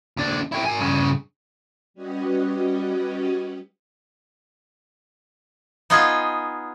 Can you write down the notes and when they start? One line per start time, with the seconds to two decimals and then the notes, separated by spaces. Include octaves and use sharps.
0.17 D#2 D4
0.52 E4 G4
0.65 A#4 G#5
0.80 G2 C#3
1.94 G3 C#4 F#4 G4 B4 D#5
5.90 B3 D#4 F4 G#4